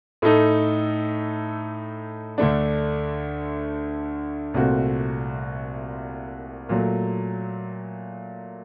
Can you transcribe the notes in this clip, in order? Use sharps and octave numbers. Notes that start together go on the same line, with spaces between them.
A2 A3 D#4 A4
D2 D3 A3 D4
C2 A#2 A3 C4 F#4
A#2 F#3 A3